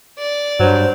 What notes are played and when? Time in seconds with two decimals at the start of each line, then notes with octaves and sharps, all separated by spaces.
0.18 D5
0.60 G2 F#3 C5